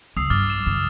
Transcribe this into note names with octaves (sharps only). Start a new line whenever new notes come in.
C#2 D#6 E6 C7
G2 D6 F6 A6
E7
F#2 C#3